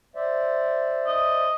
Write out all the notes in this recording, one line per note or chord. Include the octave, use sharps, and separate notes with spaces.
C5 D5 E5
D#5